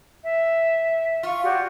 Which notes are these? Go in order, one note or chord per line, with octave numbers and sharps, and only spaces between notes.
E5
F4 C#6
F#4 G4 D5